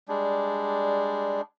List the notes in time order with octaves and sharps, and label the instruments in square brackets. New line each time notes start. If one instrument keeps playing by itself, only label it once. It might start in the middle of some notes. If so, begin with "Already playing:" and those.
[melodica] G3 G#3 D4